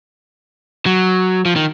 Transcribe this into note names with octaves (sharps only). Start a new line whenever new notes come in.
F#3
F3
D#3